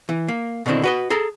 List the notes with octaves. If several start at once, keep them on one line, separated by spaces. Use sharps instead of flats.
E3
A#3
B2 D3 D#3 C4 E4
F#4 B4 D#5
G#4 A4 A#5